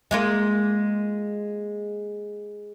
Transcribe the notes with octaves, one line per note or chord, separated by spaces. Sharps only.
G#3 A#3 F4